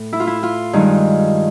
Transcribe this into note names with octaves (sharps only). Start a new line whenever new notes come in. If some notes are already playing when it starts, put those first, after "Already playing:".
Already playing: A2
E4
F4
E4
F4
G2 D#3 G#3 D#4